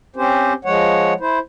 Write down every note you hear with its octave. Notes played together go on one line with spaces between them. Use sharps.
C4 C#4 G4 C5
F3 G#3 C#5 F#5
E4 C5